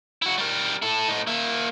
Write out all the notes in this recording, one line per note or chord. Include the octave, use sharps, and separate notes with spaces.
E4 F#4
G3 A#4
E4 A4
A2 D#4
A#3 E5